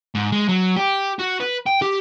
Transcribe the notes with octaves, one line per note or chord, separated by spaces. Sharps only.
G#2
G#3
F#3
G4
F#4
B4
G5
G4